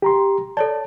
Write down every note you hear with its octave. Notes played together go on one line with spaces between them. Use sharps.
G4 A#5 C6
A4 C#5 D5 A5